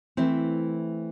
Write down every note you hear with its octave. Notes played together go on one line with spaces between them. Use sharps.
E3 A3 C4 E4